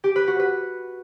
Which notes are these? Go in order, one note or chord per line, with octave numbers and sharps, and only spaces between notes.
G4
B4
F#4
B4